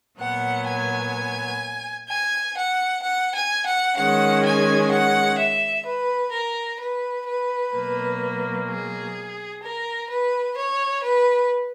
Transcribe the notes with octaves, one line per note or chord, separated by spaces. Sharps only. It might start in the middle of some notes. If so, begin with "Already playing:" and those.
A#2 F#3 B3 F#5
G#5
G#5
F#5
F#5
G#5
F#5
D#3 G#3 C#4 F#5
G#5
F#5
E5
B4
A#4
B4
B4
B2 F#3 A#3
G#4
A#4
B4
C#5
B4